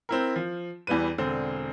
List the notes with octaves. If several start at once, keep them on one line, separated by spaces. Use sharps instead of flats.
C4 E4 A#4
F3
E2 E3 G3 B4 D#7
E1 D3 C4